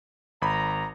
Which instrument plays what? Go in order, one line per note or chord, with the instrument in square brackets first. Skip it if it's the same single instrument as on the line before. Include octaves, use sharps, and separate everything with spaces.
[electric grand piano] G#1 B5 [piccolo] A#5